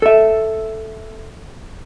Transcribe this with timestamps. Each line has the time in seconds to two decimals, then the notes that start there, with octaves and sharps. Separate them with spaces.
0.02 A4 E5